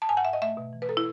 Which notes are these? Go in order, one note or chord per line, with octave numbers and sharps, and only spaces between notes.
A5
G#2 G#5
F#5
G#2 E5
D#5
A3 E5
B2
E3
B4
A4
E4